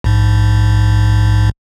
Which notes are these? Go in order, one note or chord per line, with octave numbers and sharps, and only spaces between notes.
A#1 G#2